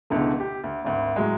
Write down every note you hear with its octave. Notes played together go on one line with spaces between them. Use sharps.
C#2 B2 D3 E3 A3
G4
D2
G#1 D2
A2 F#3 G#3